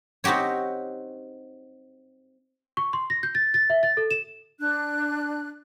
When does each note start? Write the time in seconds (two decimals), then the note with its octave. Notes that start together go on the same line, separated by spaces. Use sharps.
0.24 C4 D#4 F#4 G4 C#5
2.77 C#6
2.93 C6
3.10 A#6
3.23 G6
3.35 A6
3.54 A6
3.70 E5
3.83 A6
3.97 A4
4.11 E7
4.60 D4 F#6